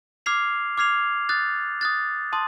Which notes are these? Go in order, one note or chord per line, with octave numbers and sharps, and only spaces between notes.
D6 F6 G#6 C7 F7
D6 F6 G#6 C7 F7
D#6 F#6 A6
D#6 F#6 A6
A5 C6 D#6